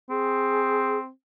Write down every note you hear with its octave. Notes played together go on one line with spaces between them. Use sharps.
C4 G#4